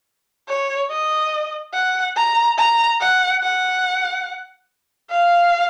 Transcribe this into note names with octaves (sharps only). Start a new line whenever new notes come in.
C#5
D#5
F#5
A#5
A#5
F#5
F#5
F5